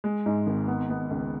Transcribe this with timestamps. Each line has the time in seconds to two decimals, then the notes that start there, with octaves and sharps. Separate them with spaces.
0.04 G#3
0.26 G#2
0.47 G#1
0.68 B3
0.90 B3
1.11 C#2